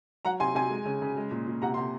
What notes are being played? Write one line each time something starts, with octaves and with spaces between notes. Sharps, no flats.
F#3 F#5 A#5
C3 G#5 C6
C3 G#5 C6
G#3
C#3
C#3
G#3
A#2
A#2
C3 F#5 A#5
C3 C6